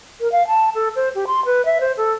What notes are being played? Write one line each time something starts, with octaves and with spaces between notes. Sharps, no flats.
A#4
F5
A5
A4
C5
G4
C6
B4
E5
C5
A4